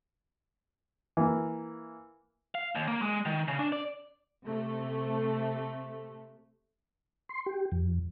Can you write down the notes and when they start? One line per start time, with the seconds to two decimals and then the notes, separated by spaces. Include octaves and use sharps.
1.17 E3 A#3
2.55 F5
2.75 D#2
2.88 A#3
3.02 G#3
3.26 D#3
3.48 C#3
3.59 D4
3.72 D5
4.45 C3 A3
7.29 C6
7.46 G4
7.72 F2